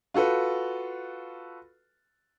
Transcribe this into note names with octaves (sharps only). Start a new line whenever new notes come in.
F4 F#4 A4 B4